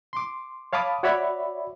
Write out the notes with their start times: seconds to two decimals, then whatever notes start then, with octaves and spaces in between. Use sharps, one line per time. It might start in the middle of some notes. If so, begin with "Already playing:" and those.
0.13 C6 D6
0.73 C#5 F5 A5 B5 D6 D#6
1.03 F#4 C#5 D5 E5 B5